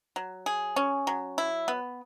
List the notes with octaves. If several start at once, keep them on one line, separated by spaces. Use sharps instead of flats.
F#3
G#4
C#4
F#3
E4
B3